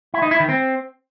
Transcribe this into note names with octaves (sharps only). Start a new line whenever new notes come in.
E4
D#4
E4
D#3
C4